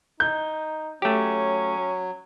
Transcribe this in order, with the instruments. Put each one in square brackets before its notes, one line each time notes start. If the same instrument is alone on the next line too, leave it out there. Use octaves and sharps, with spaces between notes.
[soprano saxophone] D#4 [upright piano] G6
[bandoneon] F#3 [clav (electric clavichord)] A3 G4 [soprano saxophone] C#4